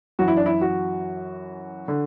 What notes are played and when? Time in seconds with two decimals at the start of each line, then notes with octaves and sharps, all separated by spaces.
0.19 F#2 E3 F#4
0.28 E4
0.37 D4
0.46 E4
0.61 F#4
1.88 D3